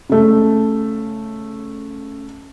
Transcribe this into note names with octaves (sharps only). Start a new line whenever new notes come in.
C#3 A3